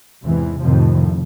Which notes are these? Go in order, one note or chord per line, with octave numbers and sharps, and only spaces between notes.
E2 G#2 C3 E3
F2 A2 C3 D#3 F3